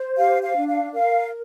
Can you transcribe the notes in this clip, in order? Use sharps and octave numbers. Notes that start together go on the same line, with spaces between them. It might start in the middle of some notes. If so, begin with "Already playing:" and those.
Already playing: C5
G4 F5
F5
D4
F5
A#4 F5